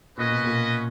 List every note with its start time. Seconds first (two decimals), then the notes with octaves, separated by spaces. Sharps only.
0.17 A#2 C#4 F#4 B4 D#5
0.31 B2
0.44 A#2